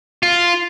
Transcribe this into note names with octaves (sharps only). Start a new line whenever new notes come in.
F4